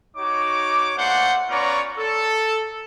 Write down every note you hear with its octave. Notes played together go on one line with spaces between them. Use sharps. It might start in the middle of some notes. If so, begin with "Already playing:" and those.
D#4 F#4 C#5 D6
A3 A#3 D4 C5 F#5
B3 C#4 F4 C#5 D5 A#5
A4